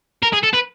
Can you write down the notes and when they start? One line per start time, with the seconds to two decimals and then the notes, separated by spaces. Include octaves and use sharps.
0.23 A#4
0.33 G#4
0.44 A4
0.54 B4